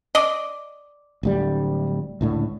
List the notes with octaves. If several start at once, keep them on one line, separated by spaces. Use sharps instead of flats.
D5 D#5
D1 D2 G3
C#2 A2 D3